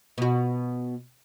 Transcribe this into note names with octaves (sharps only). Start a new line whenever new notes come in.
B2 F#4